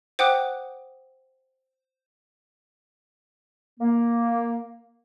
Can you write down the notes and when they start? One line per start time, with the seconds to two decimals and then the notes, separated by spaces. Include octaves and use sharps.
0.19 C5 F#5 G5 D6 D#6 F#6
3.80 A#3